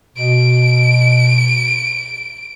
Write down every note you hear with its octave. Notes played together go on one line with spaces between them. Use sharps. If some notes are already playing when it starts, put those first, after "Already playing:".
B2 D7